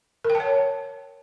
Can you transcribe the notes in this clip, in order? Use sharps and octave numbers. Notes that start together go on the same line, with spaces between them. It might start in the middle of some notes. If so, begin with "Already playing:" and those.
A#4
G5
A5
C#5